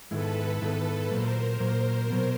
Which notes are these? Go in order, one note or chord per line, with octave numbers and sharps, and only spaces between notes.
G#2 D#3 G#3 B3 E4 A4 B4
G#2 D#3 G#3 B3 E4
A#2 F#3 A#3 A#4 C5
A#2 F#3 A#3
B2 F#3 B3